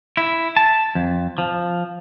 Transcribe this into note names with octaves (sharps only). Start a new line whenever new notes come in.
E4
A5
F2
F3